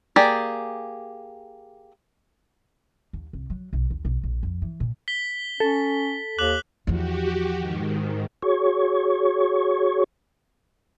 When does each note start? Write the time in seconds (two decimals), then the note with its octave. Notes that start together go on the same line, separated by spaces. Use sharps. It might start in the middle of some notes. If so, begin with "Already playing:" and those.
0.16 A#3 G4 G#4 D5
3.13 D#2
3.33 C2
3.50 F#3
3.73 B1
3.90 D#2
4.05 B1
4.23 A#1
4.43 F2
4.62 E3
4.80 A#2
5.08 B6 G7
5.60 C#4 A4
6.39 D#2 D6 F#6 F#7
6.87 E2 F3 F#4 G4
7.59 G#2 D#3
8.42 F#4 G#4 C#5 C#6